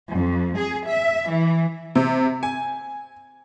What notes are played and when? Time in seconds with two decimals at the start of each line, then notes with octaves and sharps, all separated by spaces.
0.13 F2
0.58 G#4
0.89 E5
1.32 E3
1.95 C3
2.43 G#5